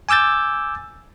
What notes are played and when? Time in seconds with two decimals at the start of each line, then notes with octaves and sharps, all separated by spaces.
0.09 G#5 D6 E6 G6 A6